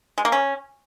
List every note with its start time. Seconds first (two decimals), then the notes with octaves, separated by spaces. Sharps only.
0.18 G#3
0.25 A#3
0.32 C#4